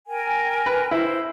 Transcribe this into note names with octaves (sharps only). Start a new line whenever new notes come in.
A#4 G5 G#5
B4
E4 C5